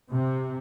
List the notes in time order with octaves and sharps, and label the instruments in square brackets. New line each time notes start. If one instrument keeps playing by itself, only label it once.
[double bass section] C3